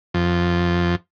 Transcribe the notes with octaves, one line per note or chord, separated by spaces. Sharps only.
F2